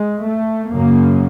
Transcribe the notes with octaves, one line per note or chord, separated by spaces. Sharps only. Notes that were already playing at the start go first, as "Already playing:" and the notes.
Already playing: G#3
A3
F#2 C#3 A#3